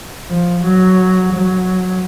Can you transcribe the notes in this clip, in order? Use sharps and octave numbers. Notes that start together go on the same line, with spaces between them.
F3
F#3
F#3